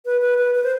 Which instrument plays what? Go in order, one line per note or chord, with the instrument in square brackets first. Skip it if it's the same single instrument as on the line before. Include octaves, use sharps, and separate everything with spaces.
[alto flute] B4
B4
B4
B4
C5